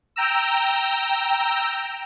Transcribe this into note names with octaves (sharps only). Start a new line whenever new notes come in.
G5 A#5 E6